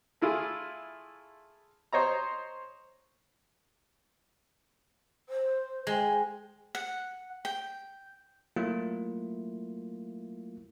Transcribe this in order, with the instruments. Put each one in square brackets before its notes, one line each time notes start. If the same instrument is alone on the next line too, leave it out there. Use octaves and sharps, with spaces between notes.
[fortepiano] A3 E4 F4 G#4
C5 C#5 D#5 A#5
[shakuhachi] C5
[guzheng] G#3 [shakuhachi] C5 [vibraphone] G5 G#5
[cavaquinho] F#5
G5
[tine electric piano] F#3 A3 A#3 E4 F4